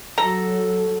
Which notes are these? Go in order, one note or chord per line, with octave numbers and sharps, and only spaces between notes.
F#3 A4 A#5